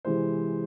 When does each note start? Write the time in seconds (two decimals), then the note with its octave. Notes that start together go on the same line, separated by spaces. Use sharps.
0.05 C3 E3 G#3 C4 C5